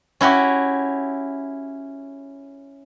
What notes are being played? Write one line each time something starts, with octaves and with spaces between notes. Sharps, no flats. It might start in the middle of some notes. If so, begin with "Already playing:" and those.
C#4 E4 F#4 G4